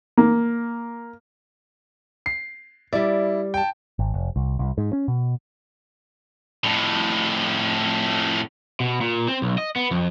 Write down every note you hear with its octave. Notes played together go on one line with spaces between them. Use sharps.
A#3
C7
G3 E4 D5
G5 A5
G#1
F1
C2
C2
G#2
C#4
B2
F2 A2
B2
A#2
C4
B1
D#5
B3
F2